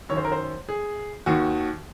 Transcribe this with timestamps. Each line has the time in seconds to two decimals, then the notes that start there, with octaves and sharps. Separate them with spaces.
0.09 F#2 D#3 C#5
0.17 C5
0.25 A#4
0.32 C5
0.69 G#4
1.26 D#2 D#3 F#4